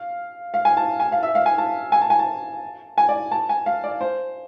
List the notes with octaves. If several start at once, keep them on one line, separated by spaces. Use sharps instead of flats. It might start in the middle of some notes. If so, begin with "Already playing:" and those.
Already playing: F5
F5
G#5
A5
G#5
F5
E5
F5
G#5
A5
G#5
A5
G#5
A5
G#5
D5
A5
G#5
F5
D5
C5